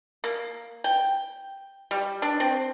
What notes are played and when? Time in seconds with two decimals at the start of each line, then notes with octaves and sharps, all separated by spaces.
0.24 A#3
0.84 G5
1.91 G3
2.22 D4
2.40 C4